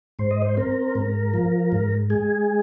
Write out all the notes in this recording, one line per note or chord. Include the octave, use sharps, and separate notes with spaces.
G#2 C5
D#5
C5
C4 A#4
G#2
F3
G#2
G#3 G#4